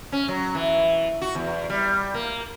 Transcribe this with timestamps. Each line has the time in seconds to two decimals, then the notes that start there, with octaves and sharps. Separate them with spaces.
0.12 C#4
0.28 F#3
0.55 E3
1.22 F#4
1.35 E2
1.70 G3
2.14 A#3